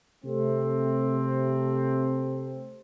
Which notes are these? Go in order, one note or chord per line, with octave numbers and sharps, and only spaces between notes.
C3 A3 C4